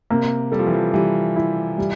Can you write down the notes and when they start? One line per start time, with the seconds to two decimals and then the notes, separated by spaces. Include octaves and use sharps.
0.10 C3 A#3
0.52 G3 A4
0.59 F3
0.67 E3
0.74 F3
0.94 E3 G3
1.36 E4
1.78 G3